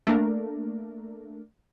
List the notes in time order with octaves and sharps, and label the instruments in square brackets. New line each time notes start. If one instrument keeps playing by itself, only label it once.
[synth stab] A3 A#3 D4 A#4